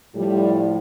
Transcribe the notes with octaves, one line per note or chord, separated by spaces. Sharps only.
A2 F3 G3